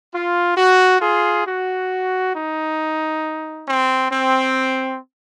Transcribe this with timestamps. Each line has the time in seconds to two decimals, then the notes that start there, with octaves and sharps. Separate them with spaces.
0.13 F4
0.56 F#4
1.01 F4 G#4
1.45 F#4
2.34 D#4
3.66 C4
4.10 C4